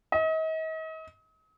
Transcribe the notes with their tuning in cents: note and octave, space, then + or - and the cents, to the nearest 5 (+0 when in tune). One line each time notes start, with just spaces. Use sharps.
D#5 +40